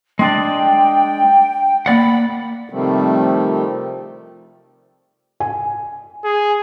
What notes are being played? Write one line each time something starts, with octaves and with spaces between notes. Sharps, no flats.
G#3 D4 D5 G5
A#3 D5 F#5 B5
C3 D#3 F3 G3 A3 C4
G#5
G#4